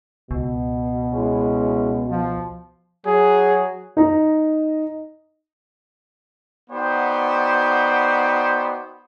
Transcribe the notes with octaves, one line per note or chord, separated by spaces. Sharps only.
C#2 B2
G#3 C#4 E4
F3
F#3 G#4
D#4 A#5
B3 D#4 F#4 C5 D5 G5